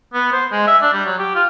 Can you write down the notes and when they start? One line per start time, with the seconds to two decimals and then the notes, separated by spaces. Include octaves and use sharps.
0.14 B3
0.32 C5
0.52 G#3
0.67 E5
0.82 D4
0.93 G3
1.06 F#3
1.19 G4
1.35 F4